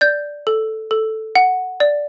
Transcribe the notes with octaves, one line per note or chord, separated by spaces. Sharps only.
D5 G6
A4
A4
F#5
D5